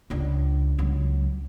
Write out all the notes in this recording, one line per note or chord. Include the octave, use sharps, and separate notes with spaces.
C#2 D4
C#2 F#3